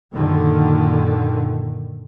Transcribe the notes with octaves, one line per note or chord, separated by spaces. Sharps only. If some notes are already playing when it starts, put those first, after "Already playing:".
F#2 A#2 D3 D#3